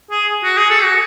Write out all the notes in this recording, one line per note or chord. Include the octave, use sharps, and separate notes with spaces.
G#4
F#4
G#4
A4
F#4